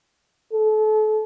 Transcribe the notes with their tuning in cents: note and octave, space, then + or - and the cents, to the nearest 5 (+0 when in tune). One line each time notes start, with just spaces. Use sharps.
A4 -35